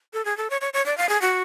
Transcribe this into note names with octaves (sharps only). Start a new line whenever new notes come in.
A4
G#4
A4
C#5
C#5
C#5
D5
F5
G#4
F#4